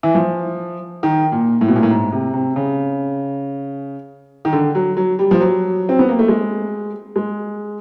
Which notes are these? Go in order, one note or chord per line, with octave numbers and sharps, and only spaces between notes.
E3
F3
D#3
A#2
A2
B2
A#2
A2
G#2
C3
C3
C#3
D#3
D3
F#3
F#3
G3
F3
F#3
C4
B3
A#3
A3
G#3
G#3